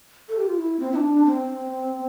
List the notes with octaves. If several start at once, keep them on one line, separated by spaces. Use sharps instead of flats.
A4
G4
F4
E4
C4
E4
D4
C4